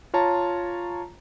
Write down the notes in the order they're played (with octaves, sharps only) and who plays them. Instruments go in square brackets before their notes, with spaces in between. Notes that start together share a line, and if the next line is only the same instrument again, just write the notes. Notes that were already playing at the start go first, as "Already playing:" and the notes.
[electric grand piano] F4 C#5 A5 A#5